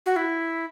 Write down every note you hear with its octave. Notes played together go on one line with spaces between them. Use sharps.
F#4
E4